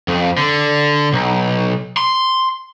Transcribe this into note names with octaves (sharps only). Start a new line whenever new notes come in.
F2
D3
B1
C6